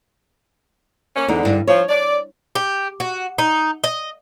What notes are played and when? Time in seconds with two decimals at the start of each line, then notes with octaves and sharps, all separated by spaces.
1.16 A#3 C#4
1.28 E2 G#2 D3 D#4
1.45 G2
1.67 F3 C#5
1.88 D5
2.55 G4
3.00 F#4
3.38 D#4
3.84 D#5